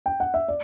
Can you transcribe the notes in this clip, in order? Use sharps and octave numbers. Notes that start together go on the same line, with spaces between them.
G5
F#5
E5
D5